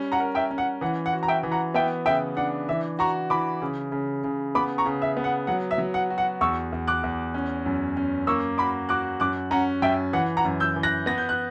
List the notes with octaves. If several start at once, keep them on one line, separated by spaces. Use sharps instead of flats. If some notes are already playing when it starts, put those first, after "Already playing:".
Already playing: G3 C#4
F#5 A#5
A#4
E5 G5
C#4
F#5
E3 F#5
F#5
F#4
A#5
E5 G5
E3
F#5 A#5
B3 E5 G5
C#3 E5 G5
D4 F#5
E3 E5
F#4 A#5 C#6
E3 B5 D6
C#3
C#3
C#3
B3 B5 D6
A#5 C#6
C#3
E5
B3
F#5
F#3 F#5
E5
F#3
F#5
F#4
F#5
E2 C#6 E6
E2
D6 F#6
E2
C#4
F#2
C#4
A#3 C#6 E6
F#4 B5 D6
F#4 D6 F#6
F#2 D6 F#6
C#4 F#5 A#5
F#2 E5 G5
E3 F#5
F#5 A#5
F#2
E6 G6
E3
F#6 A#6
B3 A#6
G6
F#6